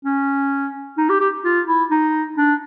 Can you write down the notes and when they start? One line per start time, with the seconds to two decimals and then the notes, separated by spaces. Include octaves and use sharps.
0.05 C#4
0.98 D#4
1.09 G4
1.21 G4
1.44 F4
1.67 E4
1.91 D#4
2.37 D4